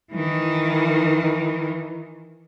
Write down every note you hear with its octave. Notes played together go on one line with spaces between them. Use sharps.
D#3 E3